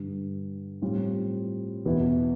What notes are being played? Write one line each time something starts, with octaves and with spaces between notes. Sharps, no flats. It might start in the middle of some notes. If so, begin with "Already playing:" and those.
Already playing: G2 D3 G3
A2 G3 C4 F4
E2 B2 B3 E4